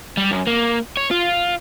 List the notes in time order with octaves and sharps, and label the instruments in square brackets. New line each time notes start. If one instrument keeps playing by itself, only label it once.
[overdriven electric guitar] G3
F#2
A#3
C#5
F4